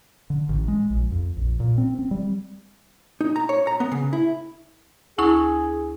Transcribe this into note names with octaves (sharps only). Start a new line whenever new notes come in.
D3
A1
G#3
A#1
F2
A#1
A#2
C4
C4
G3
D#4
A#5
C#5
A#5
B3
C#3
E4
D2 E4 G#4 C#6